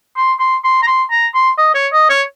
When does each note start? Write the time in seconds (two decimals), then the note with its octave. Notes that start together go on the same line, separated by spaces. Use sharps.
0.17 C6
0.40 C6
0.64 C6
0.83 A#5
0.87 C6
1.11 A#5
1.34 C6
1.58 D#5
1.75 C#5
1.93 D#5
2.10 C#5